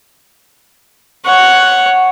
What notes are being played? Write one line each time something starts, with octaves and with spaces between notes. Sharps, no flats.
C#5 F#5